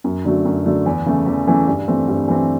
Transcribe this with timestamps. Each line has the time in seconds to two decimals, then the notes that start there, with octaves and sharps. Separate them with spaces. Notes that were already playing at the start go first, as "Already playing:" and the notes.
0.04 F#2
0.25 D3 F#3 A3
0.45 F#2
0.66 D3 F#3 A3
0.86 E2
1.06 C#3 E3 A3
1.26 E2
1.47 C#3 E3 A3
1.67 G2
1.87 E3 A3 C4
2.08 G2
2.28 E3 A3 C4